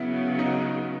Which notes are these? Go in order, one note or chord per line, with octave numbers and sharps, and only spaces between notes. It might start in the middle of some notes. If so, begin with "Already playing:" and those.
Already playing: C#3 F#3 B3 E4
D#4